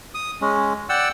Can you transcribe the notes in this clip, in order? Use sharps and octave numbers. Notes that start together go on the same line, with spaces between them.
D#6
G#3 C#4
D5 F#5 G5 E6